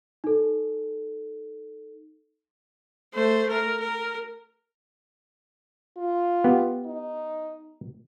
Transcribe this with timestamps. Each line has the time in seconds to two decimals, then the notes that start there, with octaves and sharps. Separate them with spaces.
0.24 D#4 A4
3.14 A3 C5
3.50 A#4
3.80 A#4
5.97 F4
6.44 B3 G4
6.85 D#4